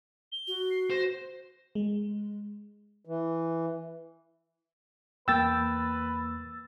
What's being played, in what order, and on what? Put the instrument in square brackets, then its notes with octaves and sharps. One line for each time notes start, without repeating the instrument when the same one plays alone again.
[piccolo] G7
[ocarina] F#4
[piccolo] C7
[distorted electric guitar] C5 [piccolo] A#6
[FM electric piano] G#3
[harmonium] E3
[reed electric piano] E2 A#3 [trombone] B4 [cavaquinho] G5 [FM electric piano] E6 A6